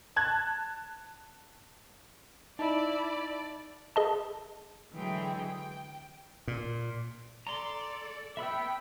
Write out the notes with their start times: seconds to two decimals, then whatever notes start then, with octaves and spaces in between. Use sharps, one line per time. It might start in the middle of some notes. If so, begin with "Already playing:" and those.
0.16 A5 F#6 G#6
2.59 D#4 E4 D5 A5
3.96 G#4 D#5 A5
4.94 D3 E3 F#3 G#3 G#4 G5
5.45 G5
6.48 A#2
7.47 A4 D5 A#5 C6
8.37 B3 E5 G5 B5 E6